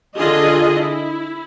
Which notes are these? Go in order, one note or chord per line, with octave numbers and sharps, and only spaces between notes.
D3 F4 G#4 D#5
E4